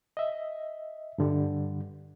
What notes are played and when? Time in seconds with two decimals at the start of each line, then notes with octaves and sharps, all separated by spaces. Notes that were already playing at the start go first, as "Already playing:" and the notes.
0.17 D#5 E5
1.18 G2 D3 G3